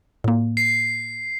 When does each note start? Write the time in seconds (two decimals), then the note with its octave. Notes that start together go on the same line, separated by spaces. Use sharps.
0.24 A2 A#3
0.57 C7